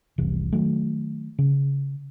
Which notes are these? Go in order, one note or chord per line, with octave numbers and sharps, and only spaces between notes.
F1 C2 C3 E3
D#3 F#3 A3
C#3